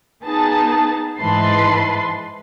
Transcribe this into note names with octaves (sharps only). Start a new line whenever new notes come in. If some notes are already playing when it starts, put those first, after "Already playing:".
B3 D#4 G#4 A5
G#2 E3 B4 A5 C6 C7